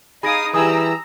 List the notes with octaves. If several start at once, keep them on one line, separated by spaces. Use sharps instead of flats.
D#4 G#4 F5 B5 D#6 A#6 D7
E3 G3 G#4 G#5 A#5 D#6 E6